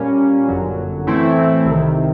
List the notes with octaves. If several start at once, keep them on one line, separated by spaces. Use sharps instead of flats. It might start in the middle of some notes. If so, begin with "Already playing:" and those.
Already playing: A#2 G3 A#3 C#4
G1 F#2 D3 F#3
A2 E3 A3 C4 E4
C2 C3 D#3